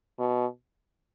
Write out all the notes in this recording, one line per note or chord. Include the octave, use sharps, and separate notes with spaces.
B2